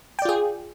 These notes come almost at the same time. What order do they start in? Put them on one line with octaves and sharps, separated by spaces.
G5 D5 F4 G#4